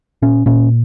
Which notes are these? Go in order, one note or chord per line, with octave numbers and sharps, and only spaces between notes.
A#2 C#4
A#2 C#4